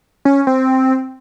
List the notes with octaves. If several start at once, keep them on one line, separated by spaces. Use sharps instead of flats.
C#4
C4